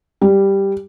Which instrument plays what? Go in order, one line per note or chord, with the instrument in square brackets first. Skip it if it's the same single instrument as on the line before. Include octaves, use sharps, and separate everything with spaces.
[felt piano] G3